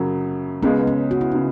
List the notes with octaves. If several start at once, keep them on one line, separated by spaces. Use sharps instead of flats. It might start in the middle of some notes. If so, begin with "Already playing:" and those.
Already playing: F#2 C#3 F#3
C#2 C#3 G#3 B3
C#4
F#4
E4
C#3 D#4